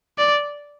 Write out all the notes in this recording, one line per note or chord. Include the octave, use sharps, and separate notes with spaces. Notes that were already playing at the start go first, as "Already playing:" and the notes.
D5